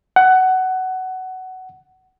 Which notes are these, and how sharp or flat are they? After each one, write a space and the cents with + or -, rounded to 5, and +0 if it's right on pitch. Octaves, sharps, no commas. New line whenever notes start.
F#5 +15